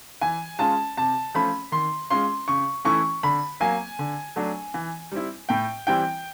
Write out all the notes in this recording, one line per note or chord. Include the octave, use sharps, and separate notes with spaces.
E3 G#5
G#3 C#4 F4 A5
C3 A5
F3 A3 C#4 B5
D#3 C6
G#3 C#4 F4 C6
C#3 C#6
E3 A3 C#4 E4 C#6
D3 B5
F#3 A#3 G#5
D3
F#3 A3 D4
E3
G3 C4 E4
A2 G5
E3 G3 C4 E4 G5